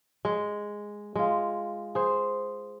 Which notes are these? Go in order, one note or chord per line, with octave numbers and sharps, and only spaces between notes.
G#3
G#3 F4
G#4 C5